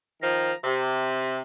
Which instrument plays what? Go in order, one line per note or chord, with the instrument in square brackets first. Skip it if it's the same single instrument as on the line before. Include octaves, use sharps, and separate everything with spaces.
[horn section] D#3 F3 A#5
C3